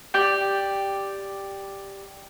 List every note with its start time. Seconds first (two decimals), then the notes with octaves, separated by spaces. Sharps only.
0.14 G4 D5 G5